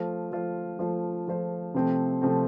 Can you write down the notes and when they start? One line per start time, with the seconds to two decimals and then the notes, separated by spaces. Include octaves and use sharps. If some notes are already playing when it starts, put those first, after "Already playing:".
Already playing: F3 A3 F4 C5
0.32 F3 A3 F4 C5
0.79 F3 A3 F4 C5
1.28 F3 A3 F4 C5
1.74 C3 F3 A3 C4
2.22 C3 F3 A3 C4